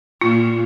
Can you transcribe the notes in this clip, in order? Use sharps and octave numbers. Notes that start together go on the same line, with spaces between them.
A#2 F4